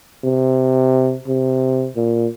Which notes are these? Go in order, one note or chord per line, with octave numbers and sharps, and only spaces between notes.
C3
C3
A#2